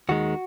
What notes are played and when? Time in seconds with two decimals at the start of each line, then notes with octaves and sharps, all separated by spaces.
0.09 D#2 D#3 G#3 F#4